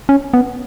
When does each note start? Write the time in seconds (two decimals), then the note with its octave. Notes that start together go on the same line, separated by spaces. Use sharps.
0.09 C#4
0.34 B3